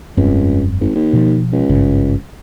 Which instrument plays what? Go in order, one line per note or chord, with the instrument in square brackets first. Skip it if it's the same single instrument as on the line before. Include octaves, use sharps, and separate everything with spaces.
[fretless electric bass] F1 G2 C4 [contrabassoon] C#2
[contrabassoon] G#1
D#2
[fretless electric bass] B2 F3
[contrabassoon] C#2
[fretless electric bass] G#1 G2 C#3